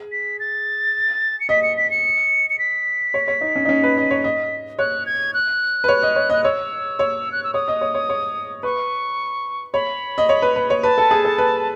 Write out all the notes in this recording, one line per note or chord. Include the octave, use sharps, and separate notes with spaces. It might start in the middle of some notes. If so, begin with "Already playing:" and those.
Already playing: G#4
B6
A6
C#7
D#5 B6
C#7
B6
C#7
C#7
B6
C#5
C#5
D#4
C#4
D#4
C#4
B4
D#5
C#5
D#5
C#5 F#6
G#6
F#6
B4
C#5
D#5
C#5
D#5 F#6
C#5 E6
C#5
F#6
E6
C#5 D#6
D#5
C#5
C#5
C#5
B4 C#6
C#5 B5
D#5
C#5
B4
B4
C#5
B4 A5
A4
G#4
A4
B4